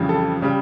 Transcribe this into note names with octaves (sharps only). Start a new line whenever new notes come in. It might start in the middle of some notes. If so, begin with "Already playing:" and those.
Already playing: F2 C#3 E3 G3
A4
C#3 G3